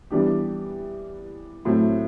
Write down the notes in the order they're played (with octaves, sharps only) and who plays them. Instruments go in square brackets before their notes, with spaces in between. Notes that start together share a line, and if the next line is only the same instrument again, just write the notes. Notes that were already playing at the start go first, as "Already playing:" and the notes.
[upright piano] E3 G3 B3 D4 G4
A2 F#3 A3 C4